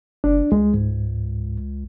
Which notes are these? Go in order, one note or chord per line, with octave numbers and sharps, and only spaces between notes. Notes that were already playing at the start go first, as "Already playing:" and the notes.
F#1 D4
C#2 G#3
G#2